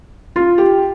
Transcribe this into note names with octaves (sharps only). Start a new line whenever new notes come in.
F4
G4